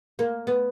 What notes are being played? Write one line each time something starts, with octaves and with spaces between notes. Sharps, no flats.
A#3
B3